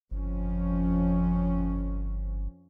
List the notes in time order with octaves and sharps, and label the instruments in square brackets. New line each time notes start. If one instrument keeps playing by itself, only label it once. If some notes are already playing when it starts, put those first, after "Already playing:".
[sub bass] G1 [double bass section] F2 F3 C#4